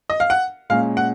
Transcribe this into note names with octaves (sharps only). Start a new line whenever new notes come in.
D#5
F5
F#5
A#2 G#3 C#4 F5
F#5